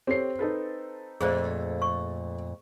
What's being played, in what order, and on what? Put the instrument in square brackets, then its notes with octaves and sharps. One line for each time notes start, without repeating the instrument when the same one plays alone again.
[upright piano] C4 C7 [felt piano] G4 A4 C#5
[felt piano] D#4 A4 B4
[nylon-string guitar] F2 A#2 A3 [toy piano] G#4 C5 D5
[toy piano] C#6